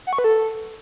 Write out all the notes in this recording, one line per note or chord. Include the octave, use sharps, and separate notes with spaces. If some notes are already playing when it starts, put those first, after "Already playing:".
F#5
C#6
B4
A4